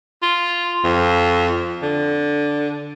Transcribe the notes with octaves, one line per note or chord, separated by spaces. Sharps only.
F4
F2
D3